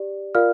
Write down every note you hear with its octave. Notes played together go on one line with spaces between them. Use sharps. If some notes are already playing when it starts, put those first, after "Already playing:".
Already playing: G4 D5
F4 A#4 D5 F5 F6